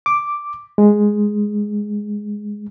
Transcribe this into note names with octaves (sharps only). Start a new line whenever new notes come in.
D6
G#3